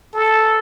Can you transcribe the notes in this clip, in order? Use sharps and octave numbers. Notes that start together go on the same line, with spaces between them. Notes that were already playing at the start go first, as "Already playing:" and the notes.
A4